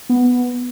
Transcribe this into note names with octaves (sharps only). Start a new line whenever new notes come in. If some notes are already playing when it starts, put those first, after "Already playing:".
B3